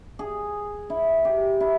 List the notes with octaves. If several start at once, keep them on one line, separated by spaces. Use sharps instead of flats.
G#4
E4
G4
E4